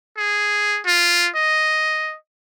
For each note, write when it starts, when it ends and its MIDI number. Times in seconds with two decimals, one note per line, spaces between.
0.17 0.80 68
0.86 1.29 65
1.36 2.16 75